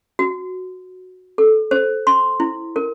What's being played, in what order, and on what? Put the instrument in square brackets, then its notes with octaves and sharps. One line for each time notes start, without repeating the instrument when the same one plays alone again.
[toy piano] F#4
A4
C5
C6
E4
A#4